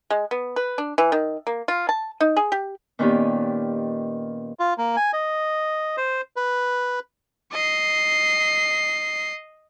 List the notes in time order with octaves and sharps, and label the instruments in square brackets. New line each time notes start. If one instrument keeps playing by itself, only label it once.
[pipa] G#3
B3
B4
D4
E3
D#3
A#3
F4
A5
D#4
G#4
G4
[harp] A#2 D#3 B3 C#4 G4
[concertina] F4
A#3
G#5
D#5
C5
B4
[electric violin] D#5 C7